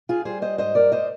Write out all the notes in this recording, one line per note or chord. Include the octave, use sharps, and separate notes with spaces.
F4 G#4
G3 G#4 C5
C5 D#5
G#2 C5 D#5
A#4 D5
C5 D#5